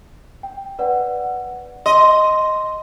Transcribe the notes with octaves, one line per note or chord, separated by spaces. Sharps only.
G5
B4 D5 F#5
D#5 C6